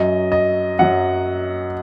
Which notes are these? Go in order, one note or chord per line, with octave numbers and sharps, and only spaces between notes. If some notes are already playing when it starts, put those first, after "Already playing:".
Already playing: F#2 F#3 D#5
D#5
F#2 F#3 F#5